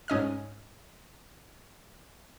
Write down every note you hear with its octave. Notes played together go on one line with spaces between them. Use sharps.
G#2 C#4 D#5 F6